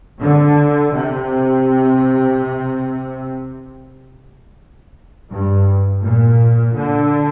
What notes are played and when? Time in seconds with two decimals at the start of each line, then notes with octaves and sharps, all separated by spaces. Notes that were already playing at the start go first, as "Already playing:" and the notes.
0.21 D3
0.94 C3
5.30 G2
6.04 A#2
6.76 D3